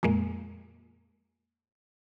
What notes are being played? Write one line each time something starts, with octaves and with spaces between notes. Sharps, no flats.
F2 A#2 G#3 A#3